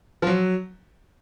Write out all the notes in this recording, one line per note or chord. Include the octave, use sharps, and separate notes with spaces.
F3
F#3